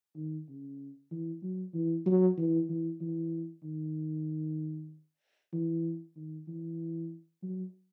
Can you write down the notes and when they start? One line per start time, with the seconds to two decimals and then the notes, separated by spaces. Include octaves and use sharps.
0.16 D#3
0.48 C#3
1.11 E3
1.43 F#3
1.74 E3
2.06 F#3
2.38 E3
2.70 E3
3.01 E3
3.64 D#3
5.53 E3
6.16 D#3
6.48 E3
7.43 F#3